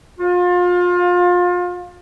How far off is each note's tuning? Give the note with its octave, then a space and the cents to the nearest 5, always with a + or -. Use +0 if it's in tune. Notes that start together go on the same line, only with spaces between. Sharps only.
F4 +30